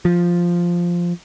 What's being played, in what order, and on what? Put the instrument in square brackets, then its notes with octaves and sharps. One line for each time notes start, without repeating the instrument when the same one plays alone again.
[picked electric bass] F3